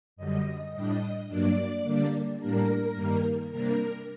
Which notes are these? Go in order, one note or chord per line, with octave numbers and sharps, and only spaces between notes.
F#2 D3 G3 D#5
A2 G3 D4 D#5
G2 F#3 A#3 D4 D5
D3 G3 A#3 D4
A2 G3 A#3 D4 A#4
G2 D#3 G3 A#3
C3 G3 A#3 D4 A#4